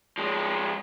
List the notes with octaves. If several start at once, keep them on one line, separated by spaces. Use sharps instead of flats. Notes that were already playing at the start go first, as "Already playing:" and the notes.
F3 G#3